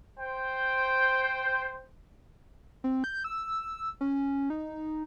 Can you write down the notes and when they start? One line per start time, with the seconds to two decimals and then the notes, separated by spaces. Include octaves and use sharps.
0.19 C5 G5
2.84 C4
3.04 G6
3.24 E6
4.01 C#4
4.50 D#4